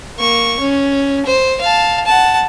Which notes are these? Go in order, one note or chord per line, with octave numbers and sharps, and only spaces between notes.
A#3 C#6
C#4
C5
F5 A5
F#5 A5